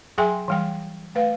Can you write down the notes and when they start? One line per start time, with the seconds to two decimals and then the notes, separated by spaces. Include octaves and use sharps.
0.18 F#3 G#4 E5 G5 G#5 C6
0.48 E3 G3 G5
1.15 A3 B4 F5